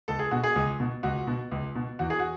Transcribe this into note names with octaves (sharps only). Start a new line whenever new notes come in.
C#2 A4
G#4
B2 F#4
G#4
C#2
B2
C#2 F#4
B2
C#2
B2
E2 F#4
G#4
F#4